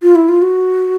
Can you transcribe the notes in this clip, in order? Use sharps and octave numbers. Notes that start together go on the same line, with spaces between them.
F4
E4
F4
F#4